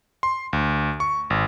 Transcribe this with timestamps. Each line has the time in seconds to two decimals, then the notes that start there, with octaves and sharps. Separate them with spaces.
0.23 C6
0.53 D2
1.00 C#6
1.30 G#1